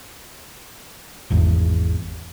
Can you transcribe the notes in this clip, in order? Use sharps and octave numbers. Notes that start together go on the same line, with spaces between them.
G#1 E2